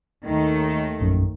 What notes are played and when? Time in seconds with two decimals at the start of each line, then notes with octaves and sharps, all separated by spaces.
0.25 D#2 D#3 A3
1.00 A#1 F#2